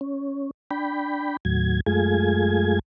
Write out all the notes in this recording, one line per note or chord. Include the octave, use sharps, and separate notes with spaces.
C#4
D4 G5 B5
D#2 A2 F#3 G#6
F#2 G#3 A3 F4 G#4 G#6